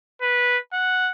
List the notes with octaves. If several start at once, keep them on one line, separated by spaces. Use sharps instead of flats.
B4
F#5